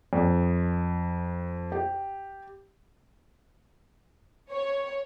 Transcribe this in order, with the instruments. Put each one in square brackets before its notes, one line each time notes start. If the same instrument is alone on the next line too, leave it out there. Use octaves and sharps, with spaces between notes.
[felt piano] F2
G4
[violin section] C#5